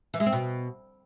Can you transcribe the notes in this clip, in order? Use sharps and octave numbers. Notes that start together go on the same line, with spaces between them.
E3
G#3
C4
B2